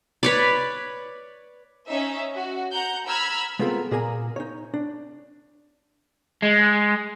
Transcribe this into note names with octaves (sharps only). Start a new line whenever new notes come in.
B4 C#5 D5
C#4 D#4 E5
F#4
F#5 A#5 G6
A#5 B5 E6 F6 G#6
G#3 B3 C4 F4 A4 A#4
A#2 G#4 A#4 G#5 A#5
D#4 C#5
D4
G#3